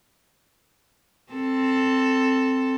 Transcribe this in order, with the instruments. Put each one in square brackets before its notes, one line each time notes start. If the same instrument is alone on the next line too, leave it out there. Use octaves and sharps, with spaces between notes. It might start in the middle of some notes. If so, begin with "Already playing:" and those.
[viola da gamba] C4 A4